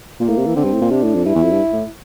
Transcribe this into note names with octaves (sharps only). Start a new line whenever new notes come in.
A#2 A#3
A2
C3
E3
D3 C4
G2
A2
A#2
C3 D4
A2
F2
G2 E4
E2
F2
G2
A2